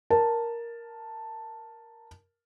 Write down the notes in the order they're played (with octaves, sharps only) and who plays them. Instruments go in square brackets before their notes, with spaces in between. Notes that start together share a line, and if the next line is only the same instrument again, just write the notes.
[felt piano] A#4 A5